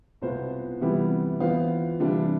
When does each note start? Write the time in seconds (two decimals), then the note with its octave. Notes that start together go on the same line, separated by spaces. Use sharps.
0.22 C2 B2 B3 F4 C5
0.81 C3 E3 G3 B3 E4
1.40 E3 B3 F4 C5 F5
2.00 C3 E3 G3 D4 F4